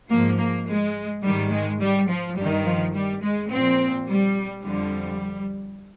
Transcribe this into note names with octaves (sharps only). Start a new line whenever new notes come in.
G#2 F3 A#3
A#3
G#3
G#2 D#3 G3
G#3
G3
F3
G2 G3
D#3
F3
G3
G#3
A#2 F3 C4
G3
F2 D3 F3 G3